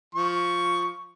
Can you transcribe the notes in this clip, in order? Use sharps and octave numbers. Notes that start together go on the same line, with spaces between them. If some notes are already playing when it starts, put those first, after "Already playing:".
F3 C#6